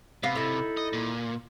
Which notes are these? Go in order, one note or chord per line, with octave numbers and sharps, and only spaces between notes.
C3 B3 F5
D#4 E4 A4
D#5
A#2